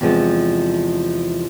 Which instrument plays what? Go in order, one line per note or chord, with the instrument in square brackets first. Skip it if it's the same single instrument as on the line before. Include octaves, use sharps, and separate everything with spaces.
[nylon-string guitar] E2 C3 F3 G#3